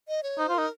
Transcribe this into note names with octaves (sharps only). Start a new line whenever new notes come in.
D#5
C#5
D#4 C5
F4
D#4 A#4